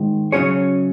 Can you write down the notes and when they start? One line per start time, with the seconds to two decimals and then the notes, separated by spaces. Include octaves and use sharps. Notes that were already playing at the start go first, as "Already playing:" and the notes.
Already playing: G#2 D#3 G#3
0.32 C#3 F#3 C#4 G#4 C#5